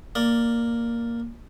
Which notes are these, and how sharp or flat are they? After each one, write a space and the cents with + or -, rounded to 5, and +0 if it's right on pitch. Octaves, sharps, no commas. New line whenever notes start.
A#3 +0 D5 +0